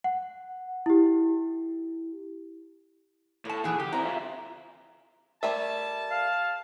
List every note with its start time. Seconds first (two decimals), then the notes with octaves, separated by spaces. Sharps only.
0.04 F#5
0.86 E4 G4
3.45 A2 C#5 A5
3.64 A#2 E3 F#3 G#4
3.80 C#3 G4
3.93 C4 E4 A#5
4.05 F4 E5
5.43 G3 A3 A#4 D5 E5 A5
6.11 F5